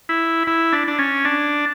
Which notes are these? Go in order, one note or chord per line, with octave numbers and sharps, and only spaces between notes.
E4
E4
D4
D4
C#4
D4